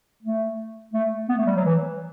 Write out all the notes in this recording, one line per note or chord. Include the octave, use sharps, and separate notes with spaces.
A3
A3
B3
A3
G3
F#3
E3